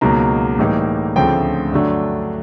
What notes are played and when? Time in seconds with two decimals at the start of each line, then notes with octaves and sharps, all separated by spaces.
0.01 C#2 B2 F#3 A#3 D#4 A#5
0.59 A2 E3 G3 A#3 D#4
1.16 D2 C#3 F3 A3 C4 G5
1.72 G2 D3 F#3 A3 D4